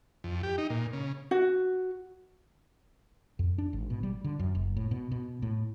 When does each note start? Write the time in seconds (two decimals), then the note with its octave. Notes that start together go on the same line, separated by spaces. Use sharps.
0.24 F2
0.43 G4
0.58 D#4
0.70 A#2
0.93 C#3
1.31 F#4
3.39 F2
3.58 D4
3.73 G#1
3.90 B2
4.03 G3
4.24 D3
4.39 F#2
4.55 F#1
4.77 A2
4.91 B2
5.11 B2
5.42 A2